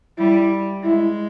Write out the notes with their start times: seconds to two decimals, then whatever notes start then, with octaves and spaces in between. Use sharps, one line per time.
0.17 G3 E4
0.83 G#3 E4